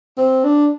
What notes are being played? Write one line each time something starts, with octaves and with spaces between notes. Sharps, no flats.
C4
D4